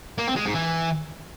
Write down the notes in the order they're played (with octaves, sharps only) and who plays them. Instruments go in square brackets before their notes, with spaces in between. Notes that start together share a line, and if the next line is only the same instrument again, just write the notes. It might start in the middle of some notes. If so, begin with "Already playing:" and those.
[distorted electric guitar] A#3
C4
G#3
G#2
E3